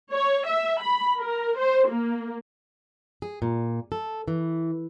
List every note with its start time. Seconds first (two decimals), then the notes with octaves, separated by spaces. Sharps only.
0.11 C#5
0.47 E5
0.82 B5
1.17 A#4
1.59 C5
1.89 A#3
3.22 G#4
3.42 A#2
3.92 A4
4.28 E3